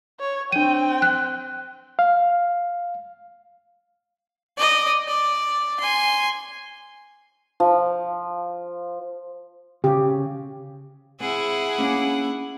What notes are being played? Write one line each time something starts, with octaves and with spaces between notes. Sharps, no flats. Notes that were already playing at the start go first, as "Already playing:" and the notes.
C#5
C4 D4 G5 D#7
F#6
F5
D5 D#5
D5
G#5 C6
F3
C#3 G4
C4 E4 G#4 F#5
A#3 C#4 D4